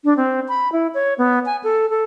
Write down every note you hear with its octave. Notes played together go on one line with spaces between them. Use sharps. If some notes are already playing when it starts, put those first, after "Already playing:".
D4
C4
B5
E4
C#5
B3
G#5
A4
A4